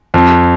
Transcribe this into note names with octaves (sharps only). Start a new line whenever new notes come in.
F2